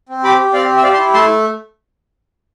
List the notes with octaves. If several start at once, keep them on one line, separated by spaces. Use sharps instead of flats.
C4
G4 B5 D6
G4
C4 D5 F5
G4
E5
G4 D5 F5
A5 C6
E4
A3 A5 C6